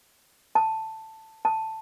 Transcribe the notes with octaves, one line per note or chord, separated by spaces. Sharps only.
A5
A5